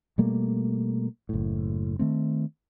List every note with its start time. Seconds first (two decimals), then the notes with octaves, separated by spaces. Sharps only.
0.18 B2 G3 A3 A#3
1.29 F#1 A2
1.99 D#3 A3 C4